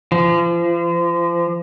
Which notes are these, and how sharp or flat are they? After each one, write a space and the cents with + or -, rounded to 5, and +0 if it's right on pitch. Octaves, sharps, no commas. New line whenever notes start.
F3 -35